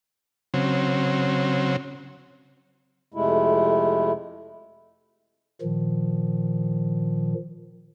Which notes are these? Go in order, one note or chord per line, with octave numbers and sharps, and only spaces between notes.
C#3 F#3 C4
F2 C3 G#3 A3 E4
A#2 D#3 F3